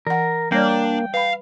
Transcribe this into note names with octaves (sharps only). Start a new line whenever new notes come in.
E3 A#4 F#5
G3 A#3 D4 C#5 D5 G5
B4 F5 B5